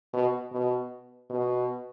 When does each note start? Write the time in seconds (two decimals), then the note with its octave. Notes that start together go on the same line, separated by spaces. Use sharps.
0.13 B2
0.52 B2
1.30 B2